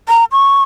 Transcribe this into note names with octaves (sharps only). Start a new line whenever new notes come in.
A#5
C#6